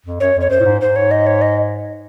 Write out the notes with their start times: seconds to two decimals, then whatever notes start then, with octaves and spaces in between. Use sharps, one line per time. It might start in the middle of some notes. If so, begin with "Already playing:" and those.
0.06 F2
0.20 F#2 C#5
0.36 F2 C#5
0.50 F#2 C5
0.60 A2
0.65 G#2
0.81 G#2 C5
0.96 C#5
1.11 D#5
1.27 C#5
1.41 D#5